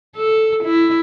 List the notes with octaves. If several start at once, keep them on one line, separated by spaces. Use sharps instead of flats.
A4
E4